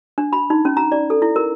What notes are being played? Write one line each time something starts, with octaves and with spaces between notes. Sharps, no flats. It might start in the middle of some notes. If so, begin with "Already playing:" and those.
D4
B5
D#4
C#4
A#5
D5
A4
E4
A#4